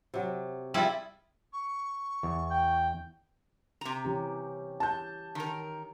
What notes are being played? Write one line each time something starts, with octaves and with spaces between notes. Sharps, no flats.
C3 F#3
G3 E4 F4 G#4
C#6
E2
G5
C3 A#5
E3 C#4 G4
A5 G6
D#3 A#4